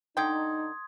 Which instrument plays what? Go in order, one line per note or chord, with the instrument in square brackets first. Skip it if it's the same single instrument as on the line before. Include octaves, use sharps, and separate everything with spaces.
[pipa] D3 G5 [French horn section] D#4 [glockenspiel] C6 D#6 G#6